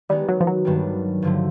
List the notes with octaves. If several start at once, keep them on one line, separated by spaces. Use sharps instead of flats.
D#3 G3 G#3 B3 D#4
F#3
F3
F#3
G2 D#3 G3 B3 D4
G2 D3 F3 A3